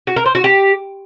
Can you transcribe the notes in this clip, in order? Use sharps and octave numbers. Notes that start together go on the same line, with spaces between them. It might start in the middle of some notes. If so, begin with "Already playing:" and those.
F#4
A#4
C5
F#4
G4